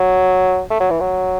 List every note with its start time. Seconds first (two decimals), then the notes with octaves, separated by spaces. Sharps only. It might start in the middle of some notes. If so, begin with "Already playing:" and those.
Already playing: F#3
0.70 A3
0.80 F#3
0.90 E3
1.00 F#3